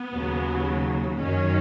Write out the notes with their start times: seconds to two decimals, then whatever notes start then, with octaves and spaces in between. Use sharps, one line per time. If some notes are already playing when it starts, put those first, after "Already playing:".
Already playing: B3
0.12 D#2 C#3 F#3
1.19 F#2 D#3 F#3 C#4